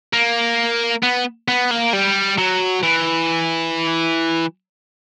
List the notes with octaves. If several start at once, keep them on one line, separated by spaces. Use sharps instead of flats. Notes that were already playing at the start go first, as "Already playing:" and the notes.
A#3
B3
B3
A#3
G3
F#3
E3